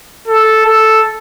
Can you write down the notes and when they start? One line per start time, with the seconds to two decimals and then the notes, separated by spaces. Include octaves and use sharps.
0.28 A4
0.66 A4